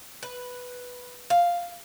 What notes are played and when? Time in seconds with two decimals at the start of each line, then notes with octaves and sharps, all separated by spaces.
0.23 B4
1.30 F5